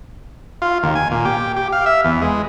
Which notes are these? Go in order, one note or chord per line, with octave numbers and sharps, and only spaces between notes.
F4
D#2
G#5
A#2
G4
G4
F5
E5
E2
G#3